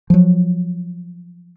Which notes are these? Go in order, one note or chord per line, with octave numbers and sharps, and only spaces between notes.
F3 F#3